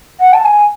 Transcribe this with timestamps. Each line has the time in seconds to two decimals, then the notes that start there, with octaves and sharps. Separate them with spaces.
0.20 F#5
0.33 A5
0.44 G#5